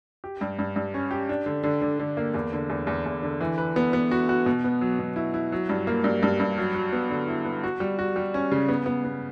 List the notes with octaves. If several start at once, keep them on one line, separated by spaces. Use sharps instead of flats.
G4
G2
G2
G2
C#4
G4
D4
D3
D3
D3
D3
A#3
E2
D3
E2
E2
E2
D3
E3
B4
B3
B3
F#4
F#4
B2
B3
F#3
B2
E4
E4
F#3
G2
A#3
G2
G2
G2
F#3
F#3
B3
D3
E4
B3
F#4
G3
F#4
G3
C#4
C#3
B3
B3
B3